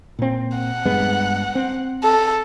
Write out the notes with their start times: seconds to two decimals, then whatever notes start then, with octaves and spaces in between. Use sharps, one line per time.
0.19 A#2 C4
0.57 F#5
0.85 G2 G#3 B3
1.55 C4
2.03 A4